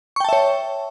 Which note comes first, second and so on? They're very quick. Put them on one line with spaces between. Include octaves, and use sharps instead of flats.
C#6 G5 A5 E5 C#5